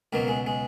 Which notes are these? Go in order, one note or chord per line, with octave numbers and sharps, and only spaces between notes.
C#2 B2 F#3 A#3
G#3
G#3